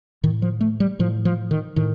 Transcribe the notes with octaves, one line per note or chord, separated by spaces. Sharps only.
A2 D#3
F3
A3
G3
A2 F3
F3
D#3
A2 D#3